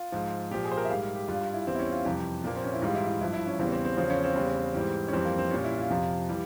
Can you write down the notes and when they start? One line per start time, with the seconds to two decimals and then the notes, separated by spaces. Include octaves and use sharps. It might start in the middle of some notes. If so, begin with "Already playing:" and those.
Already playing: F4
0.12 G#2 F3
0.51 A#2 F3 G4
0.64 G#4
0.72 C5
0.77 A#4
0.85 E5
0.90 G#2 G3 F5
1.02 F5
1.15 G4
1.28 G2 G3 F4
1.41 F4
1.54 E4
1.67 E2 E3 G3 C4
1.75 E4
1.79 C#4
1.92 F4
2.05 F2 C3 E3 G3 G4
2.44 A#2 F3 A#3
2.56 C4
2.64 C#4
2.74 E4
2.82 G#2 E3 G3 F4
2.95 E4
3.08 E4
3.21 G2 F3 E4
3.33 E4
3.47 C#4
3.59 E2 C#3 E3 G3 C4
3.72 C4
3.85 C4
3.97 E2 C#3 F3 C4
4.10 C#4
4.24 C4
4.36 E2 C#3 G3
4.74 G#2 E3 G3
5.08 C#4
5.13 F2 E3 G3 C4
5.25 A#3
5.38 C4
5.51 A#2 G3 C#4
5.64 E4
5.78 F4
5.90 F2 C3 F3
6.29 E3 G3